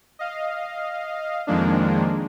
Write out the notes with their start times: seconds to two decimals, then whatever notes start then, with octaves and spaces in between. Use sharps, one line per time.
0.19 D#5 F5
1.47 F2 D#3 F3 G#3 A#3 D4